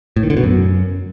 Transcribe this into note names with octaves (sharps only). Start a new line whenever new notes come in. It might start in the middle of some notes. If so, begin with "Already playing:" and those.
A2
D#3
D3
B2
F#2